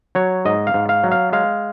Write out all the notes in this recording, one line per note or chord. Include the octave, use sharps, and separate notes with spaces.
F#3 C#5
G#2 D#5
F5
G#2
F5
F#3
F5
G#3 F5